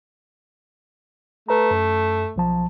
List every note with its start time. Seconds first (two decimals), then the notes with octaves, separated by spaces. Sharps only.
1.49 A3 B4 A#5
1.71 F#2
2.36 B1 F3 A5